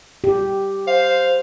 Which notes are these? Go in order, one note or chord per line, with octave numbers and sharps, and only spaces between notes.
G4
C5 F5